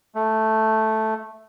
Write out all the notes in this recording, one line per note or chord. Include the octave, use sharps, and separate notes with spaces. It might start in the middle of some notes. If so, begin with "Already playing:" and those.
A3